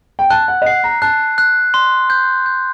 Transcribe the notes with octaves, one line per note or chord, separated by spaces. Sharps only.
G5
A5 F#6
F#5
D#5
F#5 C7
A#5
A5 F#6
F#6
C6
G6
G6